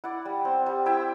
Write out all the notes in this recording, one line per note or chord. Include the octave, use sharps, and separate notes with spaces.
E4 D5 F#5
G3
C4
G3
E4 E5 G5